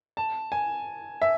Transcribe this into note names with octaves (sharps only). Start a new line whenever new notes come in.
A5
G#5
E5